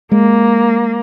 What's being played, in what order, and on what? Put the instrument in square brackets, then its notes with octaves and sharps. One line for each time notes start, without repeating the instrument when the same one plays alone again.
[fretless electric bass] G#3 [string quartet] A#3